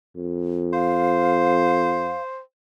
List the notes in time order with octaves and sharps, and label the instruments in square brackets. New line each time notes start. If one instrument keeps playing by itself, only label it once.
[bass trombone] F2
[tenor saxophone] C5 [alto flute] F5